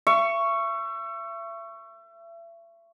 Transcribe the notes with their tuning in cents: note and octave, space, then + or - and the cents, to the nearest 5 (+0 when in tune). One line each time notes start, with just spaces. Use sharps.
E5 +35 C#6 +0